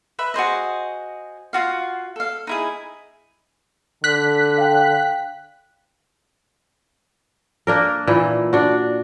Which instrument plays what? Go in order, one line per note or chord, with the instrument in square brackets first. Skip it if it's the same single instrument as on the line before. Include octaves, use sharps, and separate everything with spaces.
[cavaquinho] B4 E5 B5
F#4 G#4 C5 D#5
F4 F#4 F5
A4 F5
D#4 E4 G#4
[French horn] D3 [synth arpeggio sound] F#6 B6
[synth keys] F5 G5
[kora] A#3 D4 A#4
A#2 E3
D4 F#4